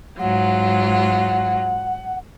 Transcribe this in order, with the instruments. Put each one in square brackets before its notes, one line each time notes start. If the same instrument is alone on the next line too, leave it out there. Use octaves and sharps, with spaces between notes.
[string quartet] G#2 F#3 F4 [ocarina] F#5